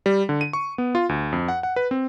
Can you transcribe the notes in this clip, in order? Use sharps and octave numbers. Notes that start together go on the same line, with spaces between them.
G3
D3
D#7
C#6
B3
F4
D2
F2
F#5
F#5
B4
C4